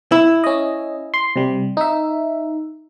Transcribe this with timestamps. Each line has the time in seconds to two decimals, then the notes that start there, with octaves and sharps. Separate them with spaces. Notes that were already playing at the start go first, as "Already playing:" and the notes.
0.12 E4
0.44 C#4 D#5
1.14 C6
1.36 C3 G3
1.77 D#4 E5